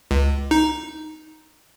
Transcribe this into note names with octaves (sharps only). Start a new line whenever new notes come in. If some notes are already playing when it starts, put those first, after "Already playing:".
C#2
D#4